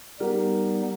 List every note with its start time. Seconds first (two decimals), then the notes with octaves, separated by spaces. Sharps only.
0.20 G3 B3 D#4 G4 A#4